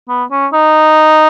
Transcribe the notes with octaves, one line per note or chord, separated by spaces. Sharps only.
B3
C#4
D#4